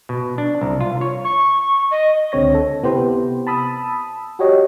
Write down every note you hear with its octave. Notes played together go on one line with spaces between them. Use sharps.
B2
D4
C2
F4
C#5
C#6
D#5
C#2 D3 C4 C#5 A#6
A4
C3 B3 E4 G4 B4 C5
A5 B5 D#6 E6
F#4 G4 C#5 D#5